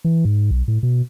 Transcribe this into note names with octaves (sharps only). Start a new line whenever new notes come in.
E3
G#2
B1
A2
B2